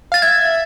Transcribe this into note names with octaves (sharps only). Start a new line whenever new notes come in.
F5 A6
E5 G#6